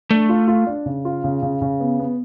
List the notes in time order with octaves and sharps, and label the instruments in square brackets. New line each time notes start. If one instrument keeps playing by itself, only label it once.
[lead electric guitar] A3 [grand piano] D4
[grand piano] F4
F4
D4
C#3
F4
C#3
C#3
C#3
B3
B3